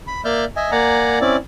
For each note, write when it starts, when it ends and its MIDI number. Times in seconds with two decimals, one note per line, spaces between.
0.07 0.21 83
0.25 0.45 58
0.25 0.45 74
0.25 0.45 76
0.25 0.45 89
0.25 0.45 91
0.56 0.71 75
0.56 0.71 76
0.56 0.71 80
0.72 1.19 58
0.72 1.19 74
0.72 1.19 78
0.72 1.19 80
0.72 1.19 82
1.21 1.36 60
1.21 1.36 61
1.21 1.36 64
1.21 1.36 74